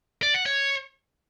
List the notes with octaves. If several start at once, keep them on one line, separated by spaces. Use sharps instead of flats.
D5
F#5
C#5